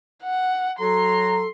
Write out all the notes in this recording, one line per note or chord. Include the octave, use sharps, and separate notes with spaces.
F#5
F#3 A4 A#5 C6